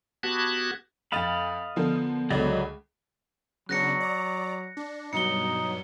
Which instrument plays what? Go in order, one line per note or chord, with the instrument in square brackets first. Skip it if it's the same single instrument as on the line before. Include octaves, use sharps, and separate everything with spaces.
[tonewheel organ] B3 F#4 G4 A5 F#6 G#6
[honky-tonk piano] F2 A6 E7 [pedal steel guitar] D#5 F5 B5
[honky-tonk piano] D3 F3 A#4 [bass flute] B3
[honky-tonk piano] C#2 D3 [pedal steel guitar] F#3 D5 D#5
[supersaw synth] C#3 B3 D4 [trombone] F#3 [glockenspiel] F#6 A#6 C#7
[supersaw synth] D5 A#5
D4
[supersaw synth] G2 B2 F#3 [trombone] D#4 [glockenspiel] C#7 G7